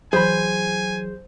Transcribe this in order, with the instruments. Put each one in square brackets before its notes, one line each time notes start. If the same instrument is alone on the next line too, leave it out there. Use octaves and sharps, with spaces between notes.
[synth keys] E3 F#3 [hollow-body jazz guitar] G#4 B5 [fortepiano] C5 [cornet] G#5